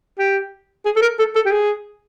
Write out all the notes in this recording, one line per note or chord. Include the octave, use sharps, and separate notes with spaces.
G4
G#4
A4
A#4
A4
A4
G4
G#4